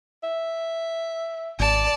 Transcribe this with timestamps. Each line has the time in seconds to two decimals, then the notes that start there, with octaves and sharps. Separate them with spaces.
0.24 E5
1.59 G#1 D5 A5